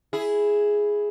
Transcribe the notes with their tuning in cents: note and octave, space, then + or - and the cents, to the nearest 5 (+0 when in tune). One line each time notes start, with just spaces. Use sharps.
E4 +0 G#4 +0